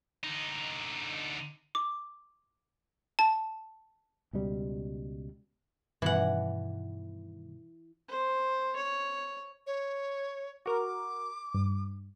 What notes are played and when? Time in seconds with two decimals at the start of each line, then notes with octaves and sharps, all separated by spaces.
0.24 D3 D#4
1.75 D6
3.19 A5
4.33 C#2 B2 G3
6.02 G2 B2 D#3 E3 F#5
8.08 C5
8.76 C#5
9.67 C#5
10.66 F#4 A#4 D6
11.54 G2